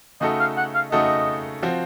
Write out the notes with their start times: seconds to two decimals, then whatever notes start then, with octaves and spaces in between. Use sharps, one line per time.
0.21 C#3 A3 D#4 F#4 A4 D#5
0.40 F5
0.57 F#5
0.75 F5
0.91 C#3 A3 D#4 F#4 A4 D#5
1.63 F3 C4 F#4